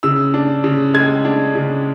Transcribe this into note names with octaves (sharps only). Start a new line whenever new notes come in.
C#3 E6
D4
C#3
G#3 G#6
D4
C#3